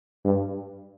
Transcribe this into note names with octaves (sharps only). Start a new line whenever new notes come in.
G2